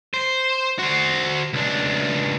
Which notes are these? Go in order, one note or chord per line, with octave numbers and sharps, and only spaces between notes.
C5
F#4 C5
C#2 D4